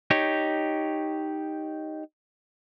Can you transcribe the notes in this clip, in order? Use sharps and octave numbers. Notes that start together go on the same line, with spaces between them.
D#4 G4 C#5